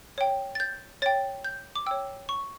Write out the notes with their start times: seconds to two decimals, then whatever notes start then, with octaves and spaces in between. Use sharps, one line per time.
0.18 C#5 G5
0.55 A6
0.60 G6
1.02 C#5 G5 A6
1.44 G6
1.76 D6
1.86 C#5 G5 E6
2.29 C#6